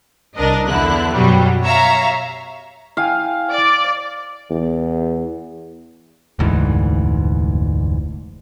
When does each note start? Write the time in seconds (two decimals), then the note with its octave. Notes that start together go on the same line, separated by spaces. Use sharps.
0.37 C2 D4 A#4 D#5
0.68 E2 D3 E4 F#6
1.11 F#2 B2 F#3 G3
1.64 C#5 E5 F5 A#5
2.97 E4 F5 G5 G#5
3.50 D5
4.50 E2
6.39 F1 D2 G#2 E3